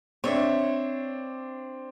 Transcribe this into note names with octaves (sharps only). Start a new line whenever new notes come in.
C4 D4 C#5 E5